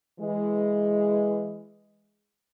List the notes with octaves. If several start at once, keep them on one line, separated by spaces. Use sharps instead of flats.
E3 G#3